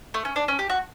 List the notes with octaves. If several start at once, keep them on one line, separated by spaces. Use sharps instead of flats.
A3
C#4
D4
C#4
G4
F#4